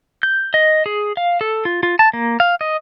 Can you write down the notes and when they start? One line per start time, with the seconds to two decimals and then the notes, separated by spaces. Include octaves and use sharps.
0.23 G6
0.54 D#5
0.86 G#4
1.17 F5
1.41 A4
1.65 F4
1.83 F4
1.99 A5
2.13 A#3
2.40 F5
2.61 D#5